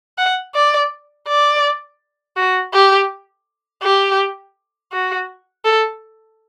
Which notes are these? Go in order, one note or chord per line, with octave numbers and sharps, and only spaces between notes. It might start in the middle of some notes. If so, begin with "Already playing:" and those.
F#5
D5
D5
F#4
G4
G4
F#4
A4